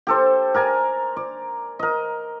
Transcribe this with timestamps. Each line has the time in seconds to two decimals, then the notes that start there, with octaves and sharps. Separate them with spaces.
0.07 G4 A4 C5
0.54 A#4 D5 G#5 A#5
1.16 D5
1.79 A#4 D#5